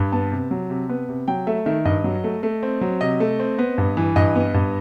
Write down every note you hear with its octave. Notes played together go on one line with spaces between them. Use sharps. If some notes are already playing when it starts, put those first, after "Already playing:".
Already playing: G2
B3 A5
C3
F#3
C3
B3
C3
F#3 G5
A3 E5
D#3 E5
G2 D#5
F#3
A3
A3
C4
F#3
C3 D#5
A3
C4
B3
G2
E3
G2 D#5
B3
G2